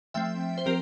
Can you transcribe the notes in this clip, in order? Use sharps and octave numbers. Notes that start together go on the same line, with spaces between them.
F3 A3 C4 E5 G5
C5
F3 C4 G4 A#4